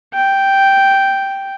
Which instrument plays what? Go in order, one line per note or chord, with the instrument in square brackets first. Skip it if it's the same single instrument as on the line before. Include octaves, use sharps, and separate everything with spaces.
[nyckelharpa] G5